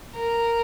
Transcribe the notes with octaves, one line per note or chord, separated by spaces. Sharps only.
A#4